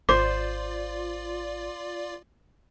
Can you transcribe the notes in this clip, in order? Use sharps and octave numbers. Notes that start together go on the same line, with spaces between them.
G#1 F4 C5 D5 D6